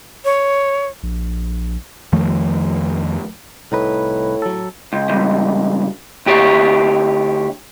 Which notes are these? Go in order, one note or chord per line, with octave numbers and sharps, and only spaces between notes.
C#5
A#1
F2 D#3 F3 A3
C2 A2 D#4 B4
F#3 A4
C#2
C#2 G2
D2 G4 C#5